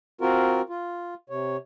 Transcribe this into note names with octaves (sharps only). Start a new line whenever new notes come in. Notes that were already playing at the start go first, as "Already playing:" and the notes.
C4 F4 F#4 A#4
F4
C3 C#5